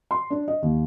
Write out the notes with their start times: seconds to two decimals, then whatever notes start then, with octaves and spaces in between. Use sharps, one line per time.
0.11 C6
0.30 D4
0.48 D#5
0.62 D#2